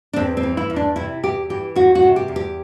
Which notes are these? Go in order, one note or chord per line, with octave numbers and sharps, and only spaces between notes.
D4
E2 C4
C4
E3
E4
E2
D4
C3 E4
E2 G4
E3 G4
E2 F#4
F#4
C3
G4
E2
G4